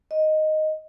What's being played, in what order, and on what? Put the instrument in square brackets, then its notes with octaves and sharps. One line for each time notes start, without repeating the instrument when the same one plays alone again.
[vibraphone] D#5